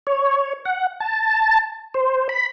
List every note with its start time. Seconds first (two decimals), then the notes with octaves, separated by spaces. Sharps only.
0.07 C#5
0.65 F#5
1.00 A5
1.94 C5
2.29 B5